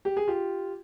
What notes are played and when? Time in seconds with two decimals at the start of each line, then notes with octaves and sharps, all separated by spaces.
0.05 G4
0.17 G#4
0.28 F4 G4